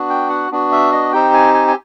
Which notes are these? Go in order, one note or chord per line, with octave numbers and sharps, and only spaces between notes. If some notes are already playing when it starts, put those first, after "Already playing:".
Already playing: B3 D4 F#4
G5
F#5
B3 D4 F#4
E5
D#5
C4 D#4 G4 G5
G#5
G#5
G#5